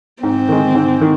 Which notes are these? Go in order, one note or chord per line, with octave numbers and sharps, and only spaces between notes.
G#2 C4
D#3 G#3
G#2
D#3